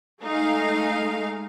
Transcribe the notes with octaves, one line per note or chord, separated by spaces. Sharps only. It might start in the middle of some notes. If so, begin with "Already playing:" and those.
G#3 A3 D#4 G#4 F5